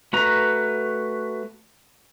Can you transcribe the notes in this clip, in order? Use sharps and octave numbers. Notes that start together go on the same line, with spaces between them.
A3 F#4 B4 A#5